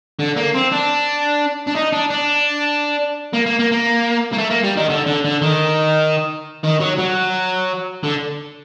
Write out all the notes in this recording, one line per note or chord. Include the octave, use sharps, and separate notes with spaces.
D3
A#3
C4
D4
D4
D#4
D4
D4
A#3
A#3
A#3
A#3
A#3
A3
A#3
G3
D#3
D3
D3
D3
D#3
D#3
F#3
F#3
D3